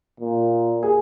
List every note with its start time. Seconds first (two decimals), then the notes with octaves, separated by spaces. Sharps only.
0.20 A#2
0.83 G#4